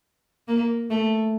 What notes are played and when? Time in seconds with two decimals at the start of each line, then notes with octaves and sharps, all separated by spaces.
0.48 A#3
0.90 A3